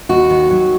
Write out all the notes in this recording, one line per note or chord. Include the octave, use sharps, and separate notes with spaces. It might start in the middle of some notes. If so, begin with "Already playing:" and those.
D#2 F#4
D#3
F#3